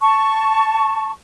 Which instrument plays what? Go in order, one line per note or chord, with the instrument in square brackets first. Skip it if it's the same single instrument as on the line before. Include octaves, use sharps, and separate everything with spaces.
[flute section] A5 C#6